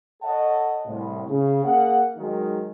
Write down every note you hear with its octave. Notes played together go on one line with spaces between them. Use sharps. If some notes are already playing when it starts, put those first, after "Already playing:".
A4 C#5 D#5 F#5 A5
C2 A2
C#3
A#3 G#4 F#5
D#3 F#3 G#3 D#4